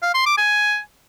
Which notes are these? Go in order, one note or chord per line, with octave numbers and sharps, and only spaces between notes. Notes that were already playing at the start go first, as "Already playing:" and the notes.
F5
C6
D6
G#5